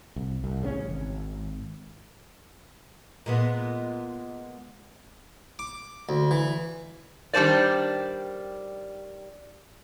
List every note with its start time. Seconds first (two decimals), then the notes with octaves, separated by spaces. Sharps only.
0.16 C2
0.44 C2
0.62 A1 C#3 A#3 C#4
0.89 G#1
3.26 A#2 G#3 B3
5.59 D6
6.09 D2
6.31 E3
7.33 D#3 G3 C#4 D4 C5 D5